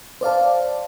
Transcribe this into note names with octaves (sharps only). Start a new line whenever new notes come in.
C5 D5 F5 A5